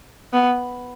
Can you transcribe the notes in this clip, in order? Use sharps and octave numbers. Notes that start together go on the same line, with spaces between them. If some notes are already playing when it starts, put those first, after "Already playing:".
B3